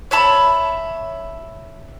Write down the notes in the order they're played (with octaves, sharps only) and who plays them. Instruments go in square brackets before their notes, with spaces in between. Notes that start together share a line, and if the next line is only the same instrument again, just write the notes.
[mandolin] C#5 E5 A5 B5